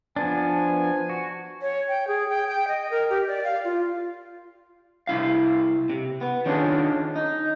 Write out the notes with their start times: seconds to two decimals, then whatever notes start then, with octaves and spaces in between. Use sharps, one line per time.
0.16 F3 B3 D4 G#5
1.09 F#4
1.62 C#5
1.88 G5
2.08 G#4
2.29 G5
2.48 G5
2.68 D#5
2.91 A#4
3.10 G4
3.28 D5
3.44 F5
3.64 F4
5.07 C2 E4 F5
5.90 C3
6.21 B3
6.46 D#3 C#4 D4 F4 G#4
7.16 D#4